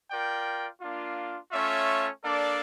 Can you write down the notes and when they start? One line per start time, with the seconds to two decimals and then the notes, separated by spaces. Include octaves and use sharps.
0.11 F4 A#4 D5 G5
0.82 A#3 D4 F4
1.52 A3 C#4 F4 C#5 E5
2.22 A#3 D4 A4 D5